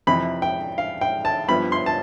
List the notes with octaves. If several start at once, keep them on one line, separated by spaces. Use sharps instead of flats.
F2 C3 E3 B5
G5
F5
G5
A5
G2 F3 B3 B5
C6
A5